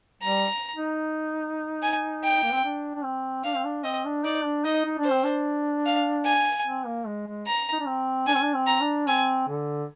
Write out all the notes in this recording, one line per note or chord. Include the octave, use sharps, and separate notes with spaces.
G3 A#5
D#4
G#5
G5
A#3
C4
D4
D4
C4
D4 F5
C4
D4
C4 D#5
D4
D#4 D5
D4
D#4 D#5
D#4
D4
C5
C4
D4
F5
G#5
C4
A#3
G#3
G#3
A#5
D#4
D4
C4
D4 G#5
C4
D4
C4
A#5
D4
C4 G#5
D3